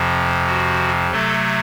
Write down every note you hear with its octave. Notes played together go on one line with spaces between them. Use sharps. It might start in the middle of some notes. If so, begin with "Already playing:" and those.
Already playing: F2 C3 F3
F#4
C3 F#3 A3 A4